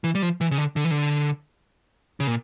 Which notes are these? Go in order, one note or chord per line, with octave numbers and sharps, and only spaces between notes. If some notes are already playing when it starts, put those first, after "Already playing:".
E3
G3
F3
E3
C#3
D3
D3
E3
D3
C#3
A#2